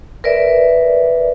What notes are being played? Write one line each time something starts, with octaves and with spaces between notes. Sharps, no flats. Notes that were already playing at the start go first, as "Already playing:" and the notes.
A#4 B4 D5 E5